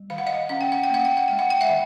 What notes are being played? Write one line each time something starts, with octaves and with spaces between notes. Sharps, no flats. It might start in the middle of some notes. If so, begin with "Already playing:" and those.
Already playing: G3
D#3 F5
F#5
D#5 F5
C#4 F#5
G5
F#5
G5
A#3 F#5
G5
F#5
G#3 G5
F#5
G5
E5 F#5
D#3